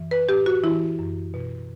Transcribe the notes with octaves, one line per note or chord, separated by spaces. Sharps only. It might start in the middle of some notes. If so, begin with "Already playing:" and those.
Already playing: F#2 E3
B4
A2 G4
F#4
E3 E4
F#2
B2